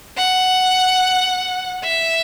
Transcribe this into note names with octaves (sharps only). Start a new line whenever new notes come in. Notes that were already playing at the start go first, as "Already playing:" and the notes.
F#5
E5